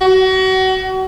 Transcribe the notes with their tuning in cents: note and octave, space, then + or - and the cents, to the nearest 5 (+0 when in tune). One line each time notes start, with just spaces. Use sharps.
F#4 +30